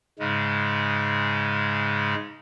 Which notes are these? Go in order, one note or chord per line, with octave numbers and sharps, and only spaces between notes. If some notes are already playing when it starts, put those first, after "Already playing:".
G#2 C#3 G#3